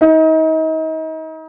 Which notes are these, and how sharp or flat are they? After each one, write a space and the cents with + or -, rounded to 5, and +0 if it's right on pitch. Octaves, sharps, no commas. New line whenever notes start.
D#4 +35